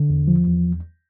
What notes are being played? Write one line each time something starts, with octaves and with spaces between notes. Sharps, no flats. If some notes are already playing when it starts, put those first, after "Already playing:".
Already playing: D3
E2
F3
E2